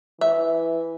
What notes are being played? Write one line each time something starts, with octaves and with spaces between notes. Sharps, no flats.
E3 E5